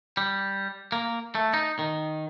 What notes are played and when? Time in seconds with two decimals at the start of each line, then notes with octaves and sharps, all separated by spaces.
0.17 G3
0.92 A#3
1.35 A3
1.54 D#4
1.79 D#3